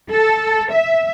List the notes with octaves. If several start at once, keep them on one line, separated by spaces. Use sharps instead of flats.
A4
E5